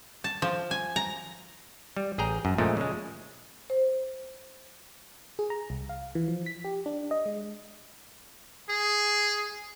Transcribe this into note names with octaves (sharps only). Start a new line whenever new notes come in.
A5
F3
G#5
A#5
G3
A1 G#4 G5 A#5
F#2
A#2 F3 G#3 A3
C#3 G#3
C5
G#4
A#5
C2
F5
E3
F3
B6
G4
D4
D#5
G#3
G#4